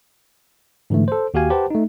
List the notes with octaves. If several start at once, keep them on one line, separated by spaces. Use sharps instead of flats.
G#2 D3 E3 A3
A4 C5
D#2 F#4 G4 F5 G#5
G4 B4 C5 F#5 A5
A3 D#4